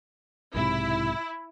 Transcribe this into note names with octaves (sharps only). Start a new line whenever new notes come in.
B1 G#2 C3 E4